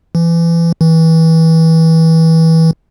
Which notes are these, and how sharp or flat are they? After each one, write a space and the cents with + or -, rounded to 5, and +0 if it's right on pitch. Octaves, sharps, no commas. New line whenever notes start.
E3 +30
E3 -25